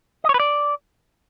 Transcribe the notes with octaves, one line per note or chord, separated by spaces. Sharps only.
D#5
C#5
B4
D5